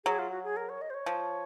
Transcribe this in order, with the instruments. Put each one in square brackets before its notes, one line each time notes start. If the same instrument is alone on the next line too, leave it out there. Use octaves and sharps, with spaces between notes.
[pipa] F#3 [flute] G#4
[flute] F4
F#4
G#4
A#4
C#5
D#5
C5
C#5
[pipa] F3